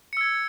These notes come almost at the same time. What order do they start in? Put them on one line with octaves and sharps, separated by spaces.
C#7 E6 G#6